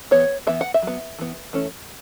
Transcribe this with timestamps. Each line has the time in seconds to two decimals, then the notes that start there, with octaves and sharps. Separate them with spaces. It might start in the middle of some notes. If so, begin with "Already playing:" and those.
0.11 E3 B3 C#5
0.47 E3 B3 E5
0.61 F#5
0.74 E5
0.82 F#3 B3
1.19 E3 B3
1.53 E3 A3 C#4